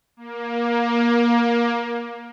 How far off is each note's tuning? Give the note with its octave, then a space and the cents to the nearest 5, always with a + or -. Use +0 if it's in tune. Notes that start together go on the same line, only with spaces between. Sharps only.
A#3 +20